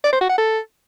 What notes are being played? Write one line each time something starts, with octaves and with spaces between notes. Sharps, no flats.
D5
C5
F#4
F#5
A4